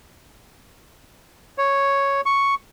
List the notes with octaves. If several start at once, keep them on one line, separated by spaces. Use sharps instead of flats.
C#5
C#6